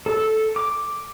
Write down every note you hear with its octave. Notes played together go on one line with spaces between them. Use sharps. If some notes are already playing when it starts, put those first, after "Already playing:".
A4
D6